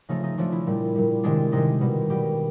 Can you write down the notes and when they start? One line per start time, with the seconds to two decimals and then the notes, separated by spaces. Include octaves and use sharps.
0.09 C#3 F3 A3 D#4
0.23 D#4
0.38 C#3 F3 A3 D4
0.52 E4
0.67 A#2 G3
0.96 A#2 G3
1.23 C3 D#3 G#3 D4
1.52 C3 D#3 G#3 D#4
1.81 B2 G3
2.10 B2 G3 G4